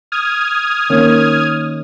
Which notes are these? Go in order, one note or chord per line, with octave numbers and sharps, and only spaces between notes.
D#6 F6 G#6
D#3 A#3 C#4